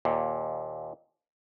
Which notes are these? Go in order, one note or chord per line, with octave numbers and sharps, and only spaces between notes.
D#2 A#2